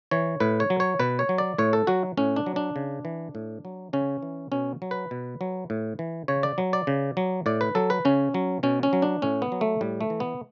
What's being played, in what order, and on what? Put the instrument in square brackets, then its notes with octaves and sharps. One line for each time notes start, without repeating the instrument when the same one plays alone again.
[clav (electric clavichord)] E3 C#5
A2 B4
C#5
F#3
C#5
B2 B4
C#5
F#3
D5
A2 C#5
A4
F#3 F#4
A2 C#4
D4
F#3
D4
C#3
E3
A2
F#3
C#3 C#4
E3
B2 C#4
F#3
B4
B2
F#3
A2
E3
C#3 C#5
D5
F#3
D5
C#3
F#3
A2 D5
B4
F#3 A4
B4
C#3 C#4
F#3
B2 C#4
C#4
F#3
D4
A2 C#4
B3
F#3
A3
A2 G3
A3
E3
B3